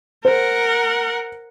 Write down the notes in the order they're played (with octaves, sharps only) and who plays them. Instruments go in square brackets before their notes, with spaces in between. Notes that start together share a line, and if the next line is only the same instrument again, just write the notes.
[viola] A#4 F#5 [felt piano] C5